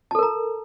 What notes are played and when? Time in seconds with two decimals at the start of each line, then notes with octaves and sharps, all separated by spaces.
0.11 A5
0.15 A4
0.19 A#4
0.23 A#5